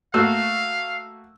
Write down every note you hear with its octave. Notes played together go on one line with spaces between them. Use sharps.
A3 A#3 F#4 F5 E6